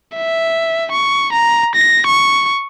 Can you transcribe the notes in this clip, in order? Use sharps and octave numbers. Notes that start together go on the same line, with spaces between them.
E5
C#6
A#5
A#6
C#6